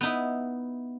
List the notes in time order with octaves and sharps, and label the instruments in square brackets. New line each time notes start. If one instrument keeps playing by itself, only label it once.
[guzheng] B3 D#4 E4